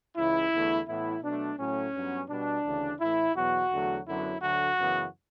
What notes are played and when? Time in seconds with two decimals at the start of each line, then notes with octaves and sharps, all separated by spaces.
0.17 C#2 C#3 E3 E4
0.53 E2 D3 A3
0.88 A2 E3 B3 E4
1.23 B2 F#3 A3 D4
1.59 A2 F#3 A3 C#4
1.94 G2 F#3 B3
2.29 B2 G3 B3 D4
2.65 D2 C#3 E3
3.00 A2 E3 A3 E4
3.35 E2 B2 F#3 F#4
3.72 E2 D3 F#3 A3
4.07 F#2 D3 F#3 B3 E4
4.42 D2 D3 F#3 A3 F#4
4.77 F#2 C#3 E3 B3